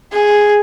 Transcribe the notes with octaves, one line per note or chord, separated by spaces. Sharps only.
G#4